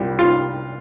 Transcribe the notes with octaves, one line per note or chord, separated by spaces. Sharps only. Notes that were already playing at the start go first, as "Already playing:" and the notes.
Already playing: C2 A#2 G3
F4